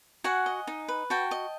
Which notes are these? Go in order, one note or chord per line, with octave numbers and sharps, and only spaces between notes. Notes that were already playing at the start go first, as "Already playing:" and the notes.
F#4 F#5 G#5
D#5
D#4
B4
F#4 G5 A5
D#5